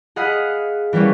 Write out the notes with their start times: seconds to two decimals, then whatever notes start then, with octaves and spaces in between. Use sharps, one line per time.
0.16 G#4 D#5 F5 F#5 B5
0.93 E3 G3 A#3 B3 C#4